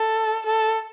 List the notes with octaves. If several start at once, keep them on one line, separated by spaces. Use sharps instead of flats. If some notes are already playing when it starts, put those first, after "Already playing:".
Already playing: A4
A4